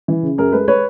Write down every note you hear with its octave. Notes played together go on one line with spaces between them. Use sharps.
E3
C#3
F#2 G#4 A#4
G#3 A4 B4
G#3 B4 C#5